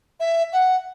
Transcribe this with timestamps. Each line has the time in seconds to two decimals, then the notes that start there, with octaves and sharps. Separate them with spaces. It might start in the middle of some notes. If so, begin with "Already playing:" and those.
0.20 E5
0.53 F#5